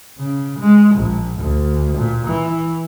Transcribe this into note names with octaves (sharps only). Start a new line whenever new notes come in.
C#3
G#3
A#1
D2
A#2
E3